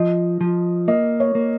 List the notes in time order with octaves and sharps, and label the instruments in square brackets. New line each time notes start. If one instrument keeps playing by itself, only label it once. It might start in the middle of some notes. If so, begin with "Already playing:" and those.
Already playing: [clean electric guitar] F3 [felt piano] D#5
[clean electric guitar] F3
[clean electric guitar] A#3 [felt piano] D#5
[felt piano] C#5
[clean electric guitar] A#3